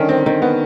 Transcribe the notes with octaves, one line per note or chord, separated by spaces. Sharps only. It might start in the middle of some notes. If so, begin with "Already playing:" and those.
Already playing: D3 D#3 G3 C#4
C4
D#3 C4
B3